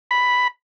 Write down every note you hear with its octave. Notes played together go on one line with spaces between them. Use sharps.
B5